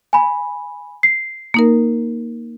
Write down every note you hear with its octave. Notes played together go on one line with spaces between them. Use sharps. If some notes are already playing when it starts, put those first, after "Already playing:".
G#5 B5
C7
A#3 D#4 A#4